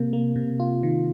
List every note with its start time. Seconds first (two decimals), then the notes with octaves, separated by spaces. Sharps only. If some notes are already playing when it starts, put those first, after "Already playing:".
Already playing: C3 A#3
0.13 A#3
0.36 C3
0.60 F4
0.83 D#3